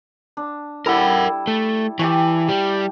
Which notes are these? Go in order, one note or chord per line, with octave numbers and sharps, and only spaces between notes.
D4
G3 E4 A4 A#4 F#5
A3
E3 G4 A5 C#6
G3